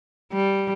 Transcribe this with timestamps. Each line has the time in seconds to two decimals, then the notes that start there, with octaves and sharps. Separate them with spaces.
0.32 G3